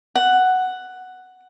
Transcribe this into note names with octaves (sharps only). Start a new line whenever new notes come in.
F#5